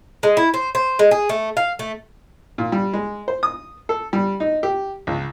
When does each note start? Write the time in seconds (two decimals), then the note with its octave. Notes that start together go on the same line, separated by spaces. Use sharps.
0.23 G#3
0.37 E4
0.54 C5
0.75 C5
0.99 G#3
1.11 G#4
1.29 A3
1.57 F5
1.79 A3
2.58 A#2
2.72 G3
2.93 G#3
3.28 C5
3.43 D#6
3.89 A4
4.13 G3
4.40 D#4
4.63 G4
5.07 C#2